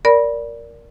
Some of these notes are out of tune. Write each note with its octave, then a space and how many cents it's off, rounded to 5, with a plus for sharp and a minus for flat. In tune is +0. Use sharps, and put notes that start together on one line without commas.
A#4 +0 D5 -15 B5 -20